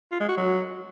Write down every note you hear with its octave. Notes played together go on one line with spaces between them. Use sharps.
F4
G#3
F#4
F#3